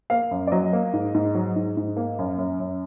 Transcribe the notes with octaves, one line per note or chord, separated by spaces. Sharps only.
A#3 F5
F#2
D5
F#3 D#5
A#3
G#2
G#2
F#3
G#2
G#2
A#3
F#2
F#2
F#2